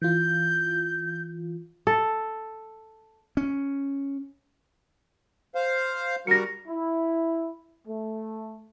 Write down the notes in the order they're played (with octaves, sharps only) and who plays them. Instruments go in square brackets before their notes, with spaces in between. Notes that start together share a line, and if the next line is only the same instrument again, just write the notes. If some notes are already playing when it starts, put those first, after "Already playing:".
[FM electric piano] E3 F4 [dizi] G6
[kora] A4
[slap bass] C#4
[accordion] C5 F5
[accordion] G3 F#4 A#4 [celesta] A#6 C#7
[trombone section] E4
A3